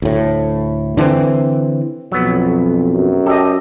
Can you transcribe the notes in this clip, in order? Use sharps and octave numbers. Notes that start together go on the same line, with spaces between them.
D2 A2
D3 E3 A3 C4
B1 F2 F#3 B3
F#2
G4 A4 D#5